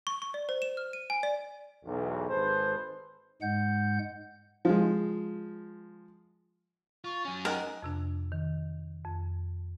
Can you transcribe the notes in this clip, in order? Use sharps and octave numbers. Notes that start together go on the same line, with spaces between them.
C#6
C#6
D5
C5
E7
F6
D#7
G#5
D5
B1 E2
G#1 G#4 A4 B4 C5
G#2 G#3 F#5 G6
F3 G#3
F4 C#6
F#3 C#4 G#5
D#3 A#4 F#5
F2 C3 D4
D#3
F2